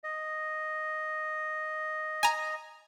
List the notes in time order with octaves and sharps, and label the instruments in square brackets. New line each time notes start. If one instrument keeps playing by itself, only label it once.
[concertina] D#5
[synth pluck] G#5 A#5